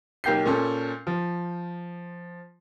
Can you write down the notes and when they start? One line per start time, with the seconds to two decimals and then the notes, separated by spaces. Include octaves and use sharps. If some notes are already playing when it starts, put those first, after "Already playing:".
0.24 B1 A#3 G4 G6 C7
0.46 A#2 C#4 A4
1.07 F3